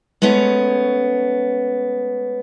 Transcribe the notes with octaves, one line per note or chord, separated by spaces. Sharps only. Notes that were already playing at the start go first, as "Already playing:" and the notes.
G#3 A3 B3 C#4 C#5